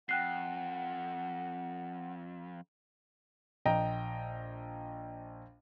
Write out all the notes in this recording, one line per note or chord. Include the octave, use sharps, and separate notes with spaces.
F2 F#5 G5 F#6 C7
A#1 D#5 G5 A#5